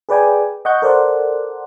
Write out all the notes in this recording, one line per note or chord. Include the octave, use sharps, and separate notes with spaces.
G#4 B4 D5 G5 G#5
D#5 F#5 C#6 G6
A4 A#4 C5 D5 F#5